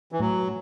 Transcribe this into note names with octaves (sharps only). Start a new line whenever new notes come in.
E3
A2 F#3